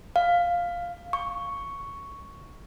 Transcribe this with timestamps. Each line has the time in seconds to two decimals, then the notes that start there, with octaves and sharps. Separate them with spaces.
0.16 F5
1.13 C#6